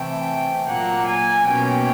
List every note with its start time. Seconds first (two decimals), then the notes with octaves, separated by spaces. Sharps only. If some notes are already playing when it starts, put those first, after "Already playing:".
Already playing: C3 E3 A3 G5
0.67 A#2 F#3 A#3 F#5
1.06 G#5
1.46 B2 F#3 A#3 C#4 G5